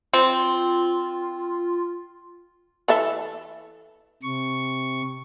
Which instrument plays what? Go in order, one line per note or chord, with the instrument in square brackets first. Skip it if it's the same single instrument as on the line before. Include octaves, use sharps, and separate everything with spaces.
[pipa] C4 [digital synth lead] F4
[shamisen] E3 A4 E5
[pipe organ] C3 C#6